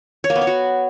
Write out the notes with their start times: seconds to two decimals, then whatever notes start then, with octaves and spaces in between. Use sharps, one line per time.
0.24 C#5
0.30 A#3
0.36 B3
0.41 C#5
0.47 F#4